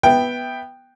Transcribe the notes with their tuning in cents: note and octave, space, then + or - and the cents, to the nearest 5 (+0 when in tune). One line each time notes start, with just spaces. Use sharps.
B3 -5 E5 +0 G5 +0